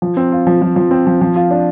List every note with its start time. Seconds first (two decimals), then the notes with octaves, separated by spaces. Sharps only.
0.02 F3
0.17 C4
0.32 F4
0.47 F3
0.62 F3
0.76 F3
0.91 C4
1.07 F3
1.21 F3
1.36 F4
1.51 D4